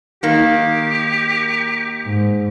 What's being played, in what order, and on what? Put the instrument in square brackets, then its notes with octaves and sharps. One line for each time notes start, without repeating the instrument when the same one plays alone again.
[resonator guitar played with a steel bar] D#3 A#3 [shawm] G4
[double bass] G#2